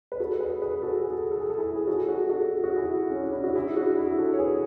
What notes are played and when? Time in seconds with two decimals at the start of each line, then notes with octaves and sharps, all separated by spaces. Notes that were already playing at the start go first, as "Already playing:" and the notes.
0.12 B4
0.20 F#4 A4
0.40 G#4 B4
0.62 G#4 B4
0.82 F#4 A4
1.04 G#4
1.12 A4
1.22 G#4
1.31 A4
1.40 G#4
1.50 A4
1.58 E4 G#4
1.76 G#4
1.88 F#4 A4
2.09 F#4 A4
2.29 F#4 A4
2.50 G#4
2.64 F#4
2.77 E4 G#4
3.10 C#4
3.21 D4
3.33 E4
3.44 F#4
3.55 E4 G#4
3.77 D4 F#4
3.98 E4 G#4
4.18 F#4 A4
4.33 C#5
4.39 G#4 B4